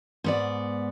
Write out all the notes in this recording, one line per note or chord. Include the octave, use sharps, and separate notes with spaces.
G#2 B3 D5